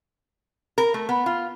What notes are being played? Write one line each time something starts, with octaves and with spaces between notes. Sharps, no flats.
A#4
A3
B3
F4